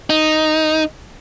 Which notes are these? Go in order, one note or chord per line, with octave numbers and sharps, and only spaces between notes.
D#4